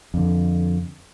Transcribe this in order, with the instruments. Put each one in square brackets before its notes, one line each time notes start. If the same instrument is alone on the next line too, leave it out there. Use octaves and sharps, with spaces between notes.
[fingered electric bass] F2 D3